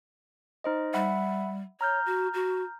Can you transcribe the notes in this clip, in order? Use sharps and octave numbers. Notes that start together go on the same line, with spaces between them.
D#4 C5 D#5
G3 E5 F#5 B5
C#5 A#5 F6 G6
F#4
F#4